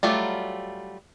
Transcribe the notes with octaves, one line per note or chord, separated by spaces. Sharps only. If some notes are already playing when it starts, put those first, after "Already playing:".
F#3 G3 A3 F4